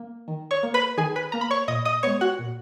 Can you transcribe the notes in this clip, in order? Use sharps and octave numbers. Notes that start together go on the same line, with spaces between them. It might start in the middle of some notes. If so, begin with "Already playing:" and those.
Already playing: A#3
D#3
C#5 C#6
A#3
B4 B5
D#3 G#4 G#5
B4 B5
A#3 A#5
B5
C#5 C#6
A#2 D#5 D#6
D#5 D#6
G#3 B3 C#5 C#6
F#4 F#5
A#2